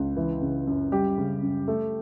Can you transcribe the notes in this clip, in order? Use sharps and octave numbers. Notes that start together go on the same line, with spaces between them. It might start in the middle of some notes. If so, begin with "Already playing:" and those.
Already playing: C#2
E3
C#3
F#2
G3 G4
C#3
F#2
A3